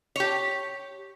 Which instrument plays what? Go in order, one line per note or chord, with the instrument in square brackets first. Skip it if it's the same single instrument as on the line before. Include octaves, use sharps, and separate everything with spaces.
[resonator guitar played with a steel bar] G4 C#5